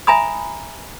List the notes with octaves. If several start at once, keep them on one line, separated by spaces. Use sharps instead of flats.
E5 G#5 A#5 B5 D#6